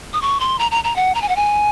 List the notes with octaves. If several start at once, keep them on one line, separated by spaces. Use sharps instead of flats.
D#6
C#6
C6
A#5
A#5
A#5
F#5
A#5
G#5
F#5
G#5